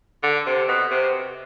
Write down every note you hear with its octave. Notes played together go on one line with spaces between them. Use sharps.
D3
C3
B2
C3